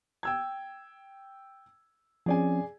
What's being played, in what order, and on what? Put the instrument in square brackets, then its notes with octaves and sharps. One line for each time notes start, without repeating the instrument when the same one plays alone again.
[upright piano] G5 E6 G#6
[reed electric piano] F3 C4 C#4 [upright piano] G#4 D5 G#5